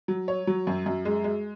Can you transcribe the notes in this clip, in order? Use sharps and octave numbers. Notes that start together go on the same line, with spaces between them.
F#3
C#5
F#3
F#2
F#2
G#3
G#3